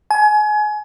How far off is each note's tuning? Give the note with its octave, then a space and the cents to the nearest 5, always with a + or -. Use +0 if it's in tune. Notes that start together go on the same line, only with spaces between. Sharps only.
G#5 +30